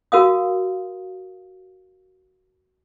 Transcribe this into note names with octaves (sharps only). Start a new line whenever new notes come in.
F#4 A#4 F5 D#6